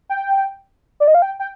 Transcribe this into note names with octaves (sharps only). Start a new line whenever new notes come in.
G5
D5
D#5
F5
G5
G5